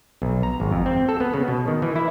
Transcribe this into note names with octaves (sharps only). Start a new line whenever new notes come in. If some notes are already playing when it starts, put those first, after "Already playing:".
B1
A#5
G#1
F2
C4
A4
B3
C#3
B2
D#3
E3
E4